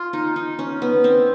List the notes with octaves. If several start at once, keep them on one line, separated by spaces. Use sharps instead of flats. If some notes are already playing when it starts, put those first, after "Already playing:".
Already playing: F4
D#4
D#4
C#4
B3
C4